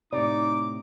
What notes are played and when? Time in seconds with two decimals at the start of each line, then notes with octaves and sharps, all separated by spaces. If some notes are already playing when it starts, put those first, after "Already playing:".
0.13 A2 C3 D#4 D5 D6